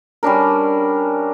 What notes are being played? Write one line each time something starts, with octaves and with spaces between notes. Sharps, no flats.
G3 C#4 D4 A#4